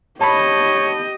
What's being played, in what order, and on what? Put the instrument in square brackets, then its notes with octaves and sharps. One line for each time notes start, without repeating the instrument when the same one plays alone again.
[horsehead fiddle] G4 D#5 [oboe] C#5 [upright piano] A5 B5